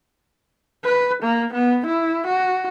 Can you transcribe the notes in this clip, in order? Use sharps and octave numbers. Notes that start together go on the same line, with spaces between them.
B4
A#3
B3
E4
F#4